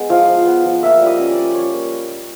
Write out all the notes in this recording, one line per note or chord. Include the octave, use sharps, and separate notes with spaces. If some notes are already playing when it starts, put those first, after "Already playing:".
Already playing: G#3 B3
F3 F5
F3
B3
F3
A#3 E5
G3
D#5
C#4
D5
C#4
G3 C#5
A#3